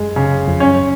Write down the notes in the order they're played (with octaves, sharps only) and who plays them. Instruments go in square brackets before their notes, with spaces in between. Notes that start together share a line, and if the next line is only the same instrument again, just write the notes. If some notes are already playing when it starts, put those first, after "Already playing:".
Already playing: [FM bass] F#2 [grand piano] G#3
[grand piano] C#3
[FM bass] F2
[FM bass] F#2 [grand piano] C#4